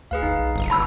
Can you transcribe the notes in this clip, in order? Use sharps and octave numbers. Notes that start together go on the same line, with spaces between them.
D2 G#4 B4 F5
G1 D#4
B1
G1
F#1 A5 B5 E6